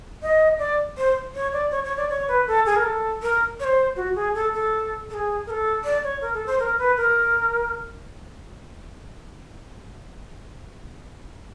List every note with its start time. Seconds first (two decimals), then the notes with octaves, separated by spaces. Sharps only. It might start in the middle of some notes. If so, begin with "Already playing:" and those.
0.22 D#5
0.59 D5
0.97 C5
1.35 C#5
1.53 D5
1.71 C#5
1.84 C#5
1.97 D5
2.09 C#5
2.28 B4
2.47 A4
2.66 G#4
2.76 A#4
2.84 A4
3.22 A#4
3.60 C#5
3.64 C5
3.96 F#4
4.15 G#4
4.35 A4
4.53 A4
5.10 A4
5.14 G#4
5.46 A#4
5.50 A4
5.84 D5
6.04 C#5
6.21 A#4
6.34 A4
6.46 C5
6.60 A#4
6.78 B4
6.97 A#4